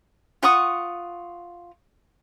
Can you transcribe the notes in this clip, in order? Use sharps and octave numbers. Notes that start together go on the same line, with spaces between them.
F4 F#5 C#6 D#6